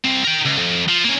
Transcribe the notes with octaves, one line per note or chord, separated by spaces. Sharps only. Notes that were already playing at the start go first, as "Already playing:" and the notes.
C2 C4
A#4 G5
C#2
F2
F3
A#3 C#4